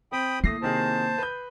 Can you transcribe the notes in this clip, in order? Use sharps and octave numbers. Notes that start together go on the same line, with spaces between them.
C4 G5 B5 D#6
A3 A#3 E4 D#6 A#6 C7
C3 D#3 G#4 C5 A5
B4 G6